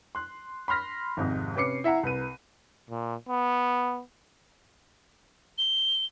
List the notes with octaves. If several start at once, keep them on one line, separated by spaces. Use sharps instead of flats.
C6 F#6
B5 C6 F6 A#6 B6
G#1 F2 G#2 C3 G#3
C3 C#4 B4 D6 C7 C#7
E4 E5 F#5 A#5
C2 B4 D#7
A#2
B3
G7